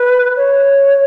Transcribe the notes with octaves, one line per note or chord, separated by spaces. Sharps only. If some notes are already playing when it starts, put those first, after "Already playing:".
Already playing: B4
C#5